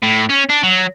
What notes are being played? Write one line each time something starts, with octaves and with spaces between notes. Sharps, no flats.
A2
C#4
D4
F#3